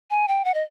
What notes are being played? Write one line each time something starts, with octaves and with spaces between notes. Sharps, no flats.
G#5
G5
F#5
D#5